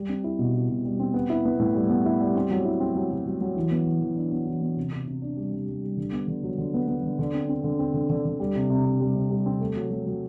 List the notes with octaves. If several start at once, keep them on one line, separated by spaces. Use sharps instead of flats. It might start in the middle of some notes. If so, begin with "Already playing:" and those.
Already playing: G3
C4
E4
B2
E4
B2
G3
C4
B3
E4
B3
A2
G3
B3
E4
G3
C4
F#3
E4
C4
F#3
F#3
F#3
F#3
E3
B3
E3
E3
D4
B3
E3
B3
C3
C3
C3
D4
G3
G3
G3
G3
D3
B3
D3
F#3
D3
B3
B3
D3
D3
C4
C4
D3
C4
D3
D3
D3
G3
C3
C3
C3
G3
C3
G3
C4
A3
F#3
F#3
F#3